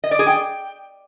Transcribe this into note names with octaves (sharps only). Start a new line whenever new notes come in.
D#5
D5
G#4
G5